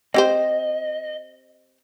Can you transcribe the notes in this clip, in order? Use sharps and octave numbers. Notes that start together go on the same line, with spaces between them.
C4 G4 C5 D#5